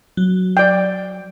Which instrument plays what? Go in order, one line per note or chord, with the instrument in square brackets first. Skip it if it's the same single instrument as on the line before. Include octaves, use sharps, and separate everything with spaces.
[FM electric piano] F#3
[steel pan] D5 G5